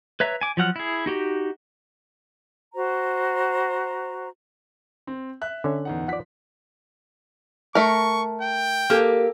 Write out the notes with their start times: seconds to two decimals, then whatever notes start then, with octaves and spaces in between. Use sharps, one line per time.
0.20 B4 C#5 E5 A#5
0.41 G#5 D6
0.57 F3 F#3 F#5 F6
0.76 E4 G#4
1.06 D#4 F#4 G4
2.75 F#4 C5 A#5
5.07 C4
5.41 E5 F#6
5.64 D3 C#4
5.85 E2 D#4 F#5
6.08 F3 D5 F#5 B6
7.75 A3 A#4 C#6
8.42 G5
8.90 A#3 G4 A4 A#4